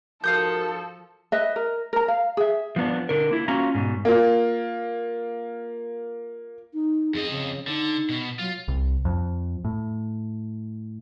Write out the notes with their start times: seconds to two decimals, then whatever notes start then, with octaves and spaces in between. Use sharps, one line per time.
0.24 G#2 F3 F#4 A4 A#4 F5 D#6 G6
1.32 B4 D#5 E5
1.56 A#4
1.93 A#4 A#5
2.08 F5
2.37 G#4 E5
2.76 F3 B3 D4
3.09 D3 A#4
3.31 A#3 E4
3.48 A#3 C#4 F4 F#4 A#5
3.75 G#2 B2
4.05 A#3 F4
6.74 D#4
7.14 F2 G#4 D#5
7.31 C#3
7.67 D3 D#4
8.09 B2
8.39 F#3 F4
8.68 C2
9.05 F2
9.65 A2